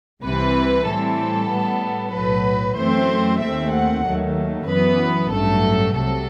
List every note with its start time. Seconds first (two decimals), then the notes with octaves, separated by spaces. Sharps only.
0.23 C2 C3 E3 B4
0.86 A2 E3 G3 C4 A4
1.50 A2 G3 B3
2.13 B1 A2 F#3 B4
2.77 F#2 E3 A3 C4 C5
3.41 D#2 D#3 A3 C4 E5
3.73 F#5
4.05 D#2 D#3 F#3 A3
4.68 F#2 E3 B3 B4
5.32 A1 G2 F#3 A3 A4
5.95 C2 C3 F#3 A4